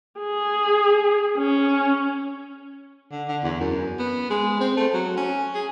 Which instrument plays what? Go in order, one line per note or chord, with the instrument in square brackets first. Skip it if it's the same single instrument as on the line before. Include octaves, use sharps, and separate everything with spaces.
[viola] G#4
C#4
[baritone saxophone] D3
D3
E2
F#2
B3
G#3
C4
A3
F#3
C#4
G#4